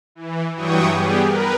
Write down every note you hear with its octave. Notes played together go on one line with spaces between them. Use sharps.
E3
G2 E3 F#3 G5 C#6 D#6
G3 B3 G4 G#4
A#4 B4